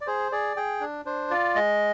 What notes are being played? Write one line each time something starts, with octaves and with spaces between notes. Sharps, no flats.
D5
G#4 C5
G#4 D5
G#4 G5
D4
D4 C5
F4 D5
G#3 D#5